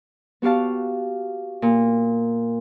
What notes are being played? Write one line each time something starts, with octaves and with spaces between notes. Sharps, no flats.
B3 F#4 G4 F5 A5
A#2